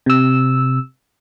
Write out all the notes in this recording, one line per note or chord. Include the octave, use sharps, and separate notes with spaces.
C3 E6